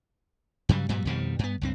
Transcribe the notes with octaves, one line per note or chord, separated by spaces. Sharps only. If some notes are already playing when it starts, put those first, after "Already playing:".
G2 C#3 F#3 G3
G2 A#2 F#3 G3
F2 B2 D#3 G3
G2 B3
C#2 G2 C4